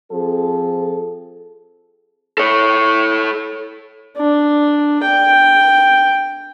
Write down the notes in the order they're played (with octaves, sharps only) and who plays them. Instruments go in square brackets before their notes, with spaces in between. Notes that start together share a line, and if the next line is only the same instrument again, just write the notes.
[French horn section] F3 C4 G#4 A4
[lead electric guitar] A4 C#5
[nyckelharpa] D4
G5